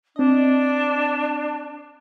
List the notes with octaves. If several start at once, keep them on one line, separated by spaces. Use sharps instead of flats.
C4 D4 D#5